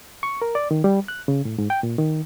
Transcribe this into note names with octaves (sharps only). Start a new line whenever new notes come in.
C#6
A#4
D5
D#3
G3
F#6
C#3
A2
G#2
G5
A#2
D#3